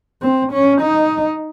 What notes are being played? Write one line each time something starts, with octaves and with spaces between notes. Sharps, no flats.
C4
C#4
D#4